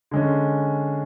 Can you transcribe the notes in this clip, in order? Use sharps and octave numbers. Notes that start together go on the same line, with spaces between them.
D3 G#3 C#4